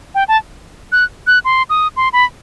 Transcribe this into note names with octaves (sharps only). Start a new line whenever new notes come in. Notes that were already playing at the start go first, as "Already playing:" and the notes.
G5
A5
F#6
F#6
C6
D#6
C6
B5